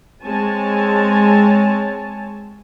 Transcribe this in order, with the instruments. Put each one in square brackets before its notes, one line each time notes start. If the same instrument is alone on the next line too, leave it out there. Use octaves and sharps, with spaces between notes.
[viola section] G#3 C4 C#5 G#5 A5